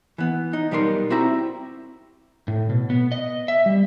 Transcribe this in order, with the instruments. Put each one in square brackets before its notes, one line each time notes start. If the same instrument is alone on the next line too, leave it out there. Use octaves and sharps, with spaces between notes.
[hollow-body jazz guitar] E3 B3
D#4
B1 G3 B3 D#4 A#4 C6
C4 E4 F#4 G4 E5 A#5
[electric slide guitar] A2
B2
B3
D#5
E5
G3